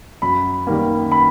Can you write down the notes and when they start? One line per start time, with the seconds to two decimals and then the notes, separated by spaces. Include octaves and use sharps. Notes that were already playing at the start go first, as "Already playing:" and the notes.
0.22 F#2 B5
0.67 D#3 G3 A#3
1.12 B5